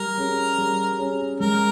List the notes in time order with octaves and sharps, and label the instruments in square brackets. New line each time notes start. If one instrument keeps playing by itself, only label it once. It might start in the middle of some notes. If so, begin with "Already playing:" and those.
Already playing: [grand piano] G3 [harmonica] A#4
[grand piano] C#4 G#4
G3
C#4 G#4
[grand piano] G#3 [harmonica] A#4